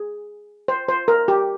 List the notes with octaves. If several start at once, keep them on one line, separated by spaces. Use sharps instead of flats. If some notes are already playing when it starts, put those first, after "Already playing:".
Already playing: G#4
C5
C5
A#4
G4